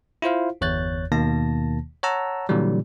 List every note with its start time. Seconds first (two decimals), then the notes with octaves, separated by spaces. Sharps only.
0.22 E4 F4 C5 F5
0.61 G1 E2 C#5 F#6 G6 A6
1.12 D#2 B2 D#3 A#3 A5 A#6
2.03 C#5 F#5 A5 A#5 E6
2.49 A#2 D3 E3 F#3 G3